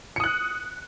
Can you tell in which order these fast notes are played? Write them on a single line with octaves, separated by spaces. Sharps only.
C#7 D#6 F#6